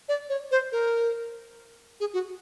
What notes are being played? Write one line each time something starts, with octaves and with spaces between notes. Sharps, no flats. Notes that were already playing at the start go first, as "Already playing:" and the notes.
D5
C#5
C5
A#4
G#4
F#4